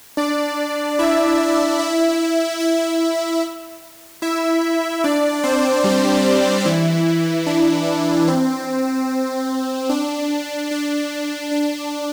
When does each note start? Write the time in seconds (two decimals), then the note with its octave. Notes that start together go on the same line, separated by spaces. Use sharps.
0.17 D4 D5
0.99 E4 E5
1.79 E4 E5
2.60 E4 E5
4.22 E4 E5
5.04 D4 D5
5.44 C4 C5
5.84 G3 G4
6.65 E3 E4
7.46 D4
8.28 C4
9.89 D4
10.71 D4
11.51 D4